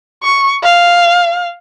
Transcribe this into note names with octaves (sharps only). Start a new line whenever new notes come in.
C#6
F5